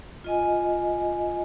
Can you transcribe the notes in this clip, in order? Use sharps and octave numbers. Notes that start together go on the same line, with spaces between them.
F4 D#5 G#5